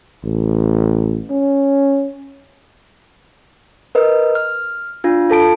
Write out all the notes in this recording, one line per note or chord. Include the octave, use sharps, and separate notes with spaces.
A1
C#4
A#4 B4 D#5
F6
D4 F4
F4 A4 A5 D7